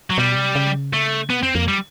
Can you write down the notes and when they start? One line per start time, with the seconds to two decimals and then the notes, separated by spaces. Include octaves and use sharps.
0.10 F#3
0.18 B2 G3
0.36 C3
0.55 C#3
0.93 A3
1.30 B2 B3
1.42 F2 C4
1.55 F2 A#3
1.68 G3